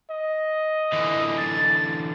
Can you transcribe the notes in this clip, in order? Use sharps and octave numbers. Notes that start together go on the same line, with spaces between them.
D#5
D3 E3
A6